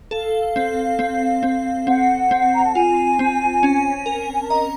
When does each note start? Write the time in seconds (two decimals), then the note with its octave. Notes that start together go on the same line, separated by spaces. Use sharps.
0.11 A4 F5
0.56 C4
0.99 C4
1.43 C4
1.87 C4 F#5
2.31 C4
2.54 A#5
2.64 A5
2.75 F4 G#5
3.19 C4
3.63 C#4
4.06 A#4
4.33 G#5
4.42 A5
4.50 D#5 A#5